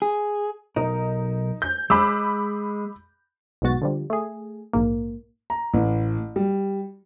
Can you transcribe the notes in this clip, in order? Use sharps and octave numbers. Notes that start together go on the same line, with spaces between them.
G#4
B1 D#4 A#4
G6
G#3 B5 D6 E6
B1 G#2 B2 F#4 A6
D3 F3 G3
A3 G#4
A#1 G#2 A#3
A#5
A1
G3